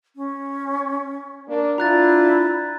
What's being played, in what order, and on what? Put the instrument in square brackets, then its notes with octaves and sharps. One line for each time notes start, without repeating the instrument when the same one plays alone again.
[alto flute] C#4
[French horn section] A#3 D4
[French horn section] D4 F4 [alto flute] E4 [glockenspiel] A#5 F#6 A6